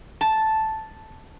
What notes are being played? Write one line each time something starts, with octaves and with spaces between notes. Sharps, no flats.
A5